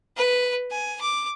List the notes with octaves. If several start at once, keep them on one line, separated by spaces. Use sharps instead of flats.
B4
G#5
D6